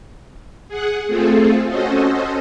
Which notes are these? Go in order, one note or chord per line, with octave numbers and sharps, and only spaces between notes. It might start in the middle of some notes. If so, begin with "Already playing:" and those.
G#4 F#5
A3 C4 F4 G#4 A4
C#4 F#4 A4 C5 D#5